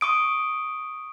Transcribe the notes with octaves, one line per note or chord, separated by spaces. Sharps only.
C#6 D#6 D7